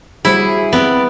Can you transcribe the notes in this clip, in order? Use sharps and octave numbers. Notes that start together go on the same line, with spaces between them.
G3 E4 F#4 G#4 C5 C#7
B3 C4 D5 G5